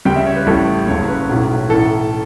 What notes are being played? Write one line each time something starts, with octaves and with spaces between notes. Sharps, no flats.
C#2 C#3 G3 G5
E5
C#5
B4
A1 A2 G3 A4
F#1 F#2 C#3 G3 C#5
B4
B1 A2 F#3
B1 A2 E3 A4